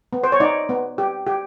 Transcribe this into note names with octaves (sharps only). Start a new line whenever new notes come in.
B3
C5
C#5
D#4 D5
B3
G4
G4